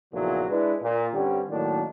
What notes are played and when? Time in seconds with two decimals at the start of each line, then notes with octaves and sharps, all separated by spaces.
0.13 B1 A#2 C#3 F3 F#3 E4
0.49 G#3 D4 E4 B4
0.81 A#2
1.13 G2 D3 G3 C4 C#4 G4
1.50 A2 D#3 F#3 A#3 D4